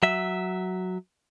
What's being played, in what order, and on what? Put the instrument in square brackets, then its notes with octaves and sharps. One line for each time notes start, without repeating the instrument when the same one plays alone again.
[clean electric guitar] F#3 E5